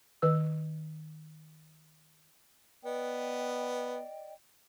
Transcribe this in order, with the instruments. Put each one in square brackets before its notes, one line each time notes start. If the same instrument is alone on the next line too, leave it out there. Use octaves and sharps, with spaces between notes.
[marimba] D#3 B4 E6
[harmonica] B3 [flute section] D5 D#5 G5